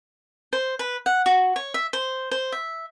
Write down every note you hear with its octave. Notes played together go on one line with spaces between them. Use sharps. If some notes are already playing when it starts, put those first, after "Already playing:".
C5
B4
F#5
F#4
C#5
E5
C5
C5
E5